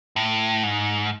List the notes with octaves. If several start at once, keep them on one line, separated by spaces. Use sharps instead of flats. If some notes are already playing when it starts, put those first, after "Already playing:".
A2
G#2